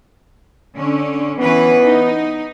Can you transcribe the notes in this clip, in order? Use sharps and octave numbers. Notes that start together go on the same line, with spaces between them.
D3 C#4
E3 B3 C#4 B4
D#4